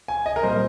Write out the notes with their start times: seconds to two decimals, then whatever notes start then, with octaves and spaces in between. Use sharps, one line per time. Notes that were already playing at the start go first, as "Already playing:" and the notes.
0.08 G#5
0.26 D#5
0.36 A#4
0.43 A#2 G3 C4 C5